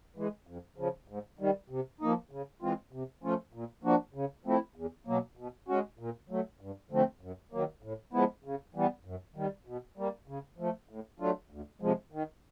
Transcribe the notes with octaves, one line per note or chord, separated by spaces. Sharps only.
E3 G#3
F2
C#3 F3
G#2
D#3 G3
C3
F3 A#3 D#4
C#3
E3 G#3 C4 F4
C3
F3 A3 C#4 F4
A#2
F3 A#3 D4 F#4
C#3
F3 A3 C4 E4
E2
B2 F#3 A#3
B2
G#3 C#4 F#4
A#2
F#3 A3
G2
D3 F3 A3 C4
F#2
D#3 F#3 A#3
A2
F3 G#3 B3 E4
C#3
E3 G3 B3
F#2
D#3 G3
B2
G3 A#3
C#3
F3 A3
A2
F#3 A3 D4 F4
D2
C3 F3 G#3
D#3